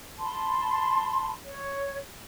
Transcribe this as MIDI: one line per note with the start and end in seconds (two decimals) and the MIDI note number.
0.19 1.30 81
0.19 1.30 83
0.19 1.30 84
1.44 1.97 73